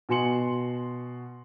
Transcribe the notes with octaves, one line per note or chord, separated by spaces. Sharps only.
B2 F#4 G#5 C6 C#7 F#7